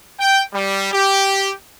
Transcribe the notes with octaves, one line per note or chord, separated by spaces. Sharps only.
G5
G3
G4